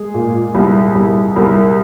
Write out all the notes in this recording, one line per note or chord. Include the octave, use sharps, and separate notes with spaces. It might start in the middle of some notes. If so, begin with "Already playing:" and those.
Already playing: G#3 G#4
A#2
C2
C2
C2 A#4